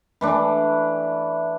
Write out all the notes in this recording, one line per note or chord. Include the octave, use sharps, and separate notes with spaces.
E3 A3 D4